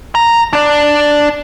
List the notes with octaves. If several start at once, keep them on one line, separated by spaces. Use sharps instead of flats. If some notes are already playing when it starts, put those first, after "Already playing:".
A#5
D4 D5